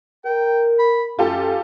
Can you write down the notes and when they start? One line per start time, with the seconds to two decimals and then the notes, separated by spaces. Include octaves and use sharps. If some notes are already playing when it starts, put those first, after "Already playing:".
0.25 A#4 G5
0.79 B5
1.19 F#2 C#4 F4 G4 A4